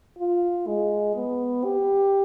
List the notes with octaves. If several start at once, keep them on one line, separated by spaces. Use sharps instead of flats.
F4
G#3
B3
G4